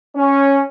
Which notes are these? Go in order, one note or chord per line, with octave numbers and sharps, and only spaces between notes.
C#4